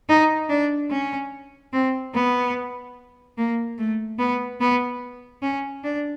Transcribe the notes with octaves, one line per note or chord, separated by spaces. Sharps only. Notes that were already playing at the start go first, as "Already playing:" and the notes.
D#4
D4
C#4
C4
B3
A#3
A3
B3
B3
C#4
D4